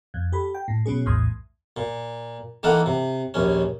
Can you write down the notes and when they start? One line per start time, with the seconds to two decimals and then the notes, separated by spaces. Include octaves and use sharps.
0.14 F2
0.32 G4 A4 B5
0.55 G5
0.68 A2
0.86 B2 F#3 C#4 G#4
1.06 A#1 E2 A2 C6 D#6 G#6
1.77 A#2
2.63 D#3 E3 A#3 A4 F#5
2.86 C3
3.34 A#1 D#2 C#4